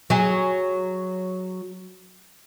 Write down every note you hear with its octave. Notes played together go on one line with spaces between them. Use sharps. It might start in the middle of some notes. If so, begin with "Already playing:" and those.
F#3 G#4